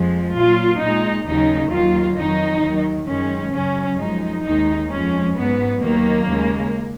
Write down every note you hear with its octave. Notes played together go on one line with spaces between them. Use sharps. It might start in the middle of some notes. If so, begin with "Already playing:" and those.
Already playing: F2 F3 G#3
A#2 F#3 F4
A#2 G#3 D#4
D#2 C#3 F#3 D#4
D#2 D#3 F#3 F4
F2 D#3 F#3 D#4
D#2 D#3 F#3
F#2 D#3 G#3 C#4
F#2 C#3 F#3 C#4
F#2 F3 G#3 D#4
D#2 D#3 G#3 D#4
F2 F3 G#3 C#4
G#2 F#3 B3
D#2 D#3 F#3 A#3
D#2 C#3 G#3